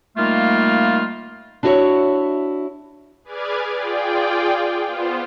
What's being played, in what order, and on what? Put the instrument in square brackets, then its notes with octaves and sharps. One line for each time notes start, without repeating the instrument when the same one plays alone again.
[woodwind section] D#3 G3 A3 A#3 F4
[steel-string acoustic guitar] D4 E4 F#4 G#4 C#5 E5
[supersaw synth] G#4 B4 D5 D6 F6 G#6
F4 G#4 D5 G5
B3 F4 C5